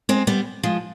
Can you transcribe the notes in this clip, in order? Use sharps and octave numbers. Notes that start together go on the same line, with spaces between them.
G#3 C4
G3 B3
F3 G#3